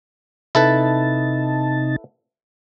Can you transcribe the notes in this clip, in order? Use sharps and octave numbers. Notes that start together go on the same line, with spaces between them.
C3 D#4 E4 A4 B4 A5